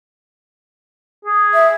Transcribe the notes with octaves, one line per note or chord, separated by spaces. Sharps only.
G#4
E5